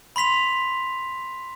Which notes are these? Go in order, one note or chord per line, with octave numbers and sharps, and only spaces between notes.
B5 C6 B6 F7